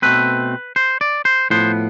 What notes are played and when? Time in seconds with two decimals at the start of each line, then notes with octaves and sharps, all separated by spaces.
0.02 B2 A3 C4 B4
0.76 C5
1.01 D5
1.25 C5
1.50 A2 F3 B3 C5